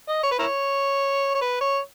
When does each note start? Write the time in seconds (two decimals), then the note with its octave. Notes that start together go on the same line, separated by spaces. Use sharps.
0.09 D#5
0.23 C#5
0.32 B4
0.39 E4 A#4 C#5
1.35 C#5
1.42 B4
1.61 C#5